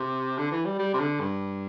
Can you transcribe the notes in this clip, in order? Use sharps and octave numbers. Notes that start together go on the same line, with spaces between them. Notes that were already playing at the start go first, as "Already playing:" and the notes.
Already playing: C3
D3
E3
G3
G3
C3
D3
G2